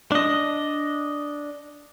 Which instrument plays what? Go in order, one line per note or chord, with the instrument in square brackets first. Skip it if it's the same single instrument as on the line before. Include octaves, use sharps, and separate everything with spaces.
[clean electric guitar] D4 D#5